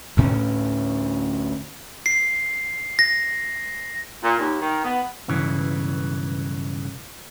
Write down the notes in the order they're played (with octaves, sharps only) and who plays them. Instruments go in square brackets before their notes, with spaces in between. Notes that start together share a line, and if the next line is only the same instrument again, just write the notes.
[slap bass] D2 A2 A3 C#4
[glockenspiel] C7
A#6
[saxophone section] A#2
D#2
D#3
B3
[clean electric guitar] B1 G2 C#3 E3